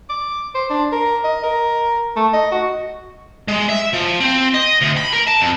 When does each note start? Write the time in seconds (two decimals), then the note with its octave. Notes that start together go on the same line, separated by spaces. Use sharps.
0.09 D6
0.55 C5
0.70 D4
0.92 A#4
1.24 D#5
1.43 A#4
2.16 A3
2.33 D#5
2.52 F#4
3.48 G#3
3.69 E5
3.94 F3
4.21 C4
4.54 D#5
4.82 D2
4.97 B5
5.13 A#4
5.27 A5
5.41 F2